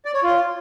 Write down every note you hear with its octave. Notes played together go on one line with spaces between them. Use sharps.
D5
C#5
F4